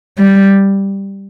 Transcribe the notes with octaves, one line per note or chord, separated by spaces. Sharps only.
G3